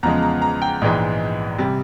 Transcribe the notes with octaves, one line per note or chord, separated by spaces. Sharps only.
E2 C#3 F3 G#3 A#5
A#5
A#5
G5
A#1 G#2 E3 G#3
C3 G3